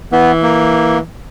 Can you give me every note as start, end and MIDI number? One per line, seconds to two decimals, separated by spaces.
0.12 1.00 52
0.12 0.32 59
0.43 0.99 58